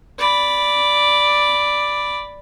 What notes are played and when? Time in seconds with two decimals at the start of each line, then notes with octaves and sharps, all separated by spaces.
0.19 D5 B5